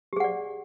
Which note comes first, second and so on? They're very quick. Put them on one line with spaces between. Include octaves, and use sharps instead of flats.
G4 G#4 F#5 D5